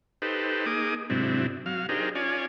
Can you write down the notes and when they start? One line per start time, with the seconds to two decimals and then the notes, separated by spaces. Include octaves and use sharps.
0.22 D#4 G4 A4 B4 C5
0.66 A#3 D#4 G#4 D6 D#6
1.10 G#2 C3 F#3 C4 D4 E4
1.66 F#3 F5
1.89 D4 D#4 G4 G#4 A#4 C5
2.15 C#4 F4 C#5 D5 G#5